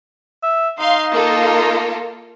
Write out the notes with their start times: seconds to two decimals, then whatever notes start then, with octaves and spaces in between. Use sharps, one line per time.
0.43 E5
0.79 D#4 F5 C6
1.14 A#3 F4 A4